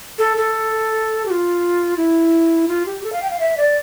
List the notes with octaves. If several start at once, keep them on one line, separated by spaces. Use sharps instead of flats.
A4
A4
G4
F4
E4
F4
G4
A4
F5
G5
F5
E5
D5